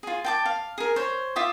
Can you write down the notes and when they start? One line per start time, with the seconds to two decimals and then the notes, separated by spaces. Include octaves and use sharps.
0.03 F4 G#4
0.24 G5 A5 D6
0.46 F5
0.78 G#4 A#4
0.96 C5 C#5
1.36 F4 E5 D6 D#6